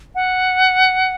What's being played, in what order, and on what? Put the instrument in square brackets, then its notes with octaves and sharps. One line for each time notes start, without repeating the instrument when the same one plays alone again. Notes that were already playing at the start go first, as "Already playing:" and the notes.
[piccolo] F#5